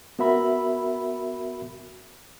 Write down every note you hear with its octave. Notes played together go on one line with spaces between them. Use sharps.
B3 F#4 A#4 E5 B5